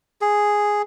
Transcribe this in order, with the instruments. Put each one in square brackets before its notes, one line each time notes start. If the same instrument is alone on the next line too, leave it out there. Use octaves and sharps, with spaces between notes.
[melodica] G#4